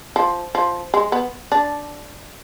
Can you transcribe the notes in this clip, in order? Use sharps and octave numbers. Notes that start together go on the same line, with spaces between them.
F3
F3
G#3
B3
D4